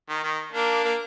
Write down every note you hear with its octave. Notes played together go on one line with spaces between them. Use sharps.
D#3
D#3
A#3 D4
A#3